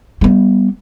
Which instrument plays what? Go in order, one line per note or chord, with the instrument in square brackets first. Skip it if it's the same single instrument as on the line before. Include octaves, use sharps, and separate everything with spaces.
[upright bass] G3 B3